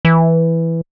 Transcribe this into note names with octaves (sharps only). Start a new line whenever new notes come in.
E3